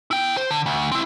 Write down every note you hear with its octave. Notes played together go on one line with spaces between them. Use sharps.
E4 G5
C5
D3
D2
C4 E4